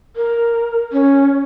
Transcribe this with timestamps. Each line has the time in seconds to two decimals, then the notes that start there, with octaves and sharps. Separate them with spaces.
0.16 A#4
0.92 C#4